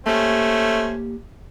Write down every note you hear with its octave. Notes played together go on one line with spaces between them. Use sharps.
A3 A#3 C#4 G4 C5 G#5